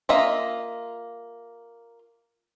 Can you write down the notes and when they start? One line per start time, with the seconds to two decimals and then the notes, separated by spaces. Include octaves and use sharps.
0.09 A#3 F4 D#5 E5